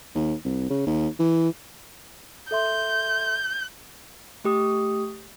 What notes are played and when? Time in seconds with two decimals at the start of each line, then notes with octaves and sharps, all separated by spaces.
0.15 D#2
0.45 C2
0.70 C#3
0.87 D#2
1.19 E3
2.51 A4 E5 C6 G6
4.44 A3 G4 D#6